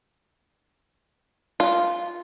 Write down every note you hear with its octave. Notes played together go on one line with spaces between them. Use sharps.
F4